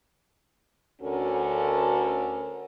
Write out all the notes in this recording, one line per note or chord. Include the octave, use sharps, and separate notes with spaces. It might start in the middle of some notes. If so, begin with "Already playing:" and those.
D2 D3 C#4 F#4 A4 A#4